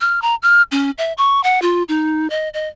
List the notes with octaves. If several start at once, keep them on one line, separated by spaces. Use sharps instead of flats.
F6
A#5
F6
C#4
E5
C#6
F#5
F4
D#4
D#5
D#5